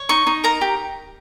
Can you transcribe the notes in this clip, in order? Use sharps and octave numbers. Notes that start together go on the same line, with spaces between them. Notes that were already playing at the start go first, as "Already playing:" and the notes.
Already playing: C#5
D#4 C#6
D#4
A#4 A#5
G4